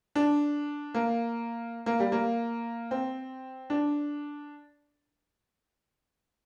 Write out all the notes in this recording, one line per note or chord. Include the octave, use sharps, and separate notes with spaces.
D4
A#3
A#3
G3
A#3
C4
D4